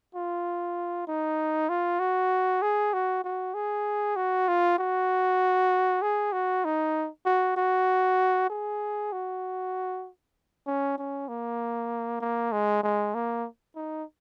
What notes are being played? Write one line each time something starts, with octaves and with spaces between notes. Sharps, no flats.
F4
D#4
F4
F#4
G#4
F#4
F#4
G#4
F#4
F4
F#4
G#4
F#4
D#4
F#4
F#4
G#4
F#4
C#4
C#4
A#3
A#3
G#3
G#3
A#3
D#4